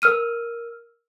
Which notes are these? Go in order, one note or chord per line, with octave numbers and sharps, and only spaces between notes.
A#4 E6 F6 D#7